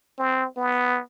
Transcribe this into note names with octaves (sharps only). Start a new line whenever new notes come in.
C4
B3